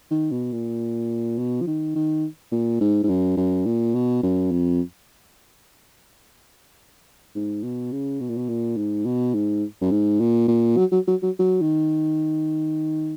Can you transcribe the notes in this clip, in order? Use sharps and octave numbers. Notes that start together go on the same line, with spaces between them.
D#3
B2
A#2
B2
F3
D#3
D#3
A#2
G#2
G#2
F#2
F#2
A#2
B2
F#2
F2
G#2
B2
C#3
B2
A#2
B2
A#2
G#2
B2
G#2
F#2
G#2
A#2
A#2
F#3
F#3
F#3
F#3
F#3
D#3